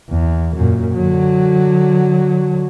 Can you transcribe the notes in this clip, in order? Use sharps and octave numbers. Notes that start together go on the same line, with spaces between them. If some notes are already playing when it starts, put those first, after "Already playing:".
E2
F#2 A#2
D3 F#3